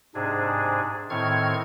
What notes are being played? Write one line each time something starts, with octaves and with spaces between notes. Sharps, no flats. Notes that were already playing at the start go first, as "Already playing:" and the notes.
G#2 C3 D4 G#4
A2 D#3 C4 C#6 F6 G#6